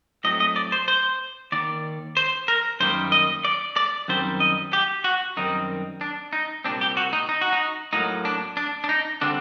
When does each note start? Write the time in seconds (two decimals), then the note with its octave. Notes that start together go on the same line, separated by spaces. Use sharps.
0.24 A2 F#3 A3 C4 D#5
0.40 D#5
0.56 D5
0.72 C5
0.88 C5
1.52 D#2 D#3 D5
2.17 C5
2.48 A#4
2.80 F#2 D#3 G3 A#3 C5
3.12 D#5
3.45 D5
3.76 D5
4.08 F#2 D#3 G3 C4 C5
4.40 D#5
4.73 G4
5.04 F#4
5.37 F#2 D#3 G3 C4 D#4
6.01 D4
6.33 D#4
6.64 C2 A#2 G3 C4 D4
6.81 G4
6.97 F#4
7.13 D#4
7.29 D#4
7.41 F#4
7.53 D#4
7.93 A2 F#3 A#3 D#4
8.25 D4
8.57 D4
8.84 D4
8.89 D#4
9.21 D3 G3 C4 D4